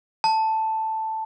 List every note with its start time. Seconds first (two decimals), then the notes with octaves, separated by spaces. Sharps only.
0.24 A5